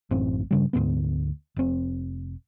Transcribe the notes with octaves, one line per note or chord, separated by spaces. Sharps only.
A1 F#2 A2 C4
G2 C#3 G3
D2 G#2 A#3 B3
F1 C4